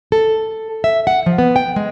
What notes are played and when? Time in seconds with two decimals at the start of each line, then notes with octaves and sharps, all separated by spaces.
0.12 A4
0.84 E5
1.07 F#5
1.26 F3
1.38 B3
1.56 G5
1.76 G#3